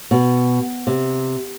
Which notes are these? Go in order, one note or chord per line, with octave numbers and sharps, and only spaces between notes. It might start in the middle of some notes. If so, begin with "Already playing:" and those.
B2
C3